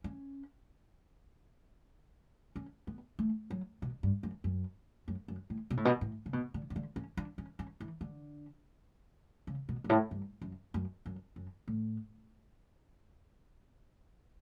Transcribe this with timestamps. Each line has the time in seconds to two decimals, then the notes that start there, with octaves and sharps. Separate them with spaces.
0.04 C#4
2.56 C#4
2.87 B3
3.19 A3
3.50 F#3
3.82 B2
4.03 G2
4.23 F#2
4.44 F#2
5.08 F#2
5.28 F#2
5.50 A2
5.70 B2
5.77 A2
5.85 B2
6.01 A2
6.26 C#3
6.33 B2
6.54 D3
6.70 C#3
6.76 D3
6.96 C#4
7.17 D4
7.38 C#4
7.59 C#4
7.80 E3
8.01 D3
9.47 C#3
9.69 B2
9.84 G2
9.89 A2
10.11 G2
10.41 F#2
10.74 F#2
11.06 F#2
11.36 F#2
11.68 A2